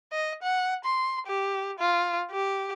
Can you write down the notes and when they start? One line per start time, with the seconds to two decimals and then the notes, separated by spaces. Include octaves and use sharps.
0.12 D#5
0.43 F#5
0.85 C6
1.27 G4
1.79 F4
2.31 G4